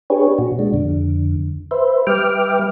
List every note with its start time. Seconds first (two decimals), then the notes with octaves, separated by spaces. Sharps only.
0.10 D4 G4 G#4 B4 C#5
0.39 A#2 F#4
0.59 A#2 G#3 D4
0.74 F2 D3
1.71 B4 C5 E5
2.07 G3 B4 E5 G5 D6 F6